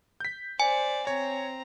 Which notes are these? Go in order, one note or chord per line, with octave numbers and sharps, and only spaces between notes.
G6 B6
C5 D5 G#5
C4 C#5 A#5